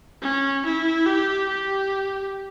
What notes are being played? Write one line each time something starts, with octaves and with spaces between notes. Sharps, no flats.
C#4
E4
G4
G4